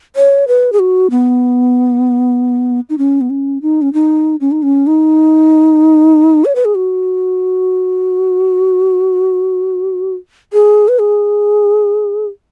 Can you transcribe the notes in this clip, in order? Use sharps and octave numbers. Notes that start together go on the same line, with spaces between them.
C#5
B4
G#4
F#4
B3
D#4
C#4
B3
C#4
D#4
C#4
D#4
C#4
D#4
C#4
D#4
C#5
B4
G#4
F#4
G#4
B4
G#4